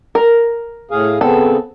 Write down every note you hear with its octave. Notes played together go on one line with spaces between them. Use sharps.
A#4
A2 G#4 F5
C#3 B3 C4 A4